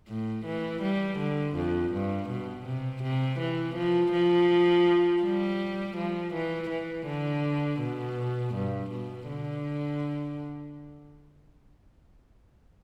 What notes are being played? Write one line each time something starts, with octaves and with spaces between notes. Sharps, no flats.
A2
E3
G3
D3
F2
G2
B2
C3
C3
E3
F3
F3
G3
F3
E3
E3
D3
B2
G2
B2
D3